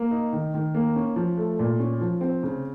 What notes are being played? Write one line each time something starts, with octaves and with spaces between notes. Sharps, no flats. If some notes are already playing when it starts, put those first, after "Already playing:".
Already playing: A#3
D#4
D#3
D#3
A#3
C#4
F3
A3
A#2
C#4
F3
C4
C#3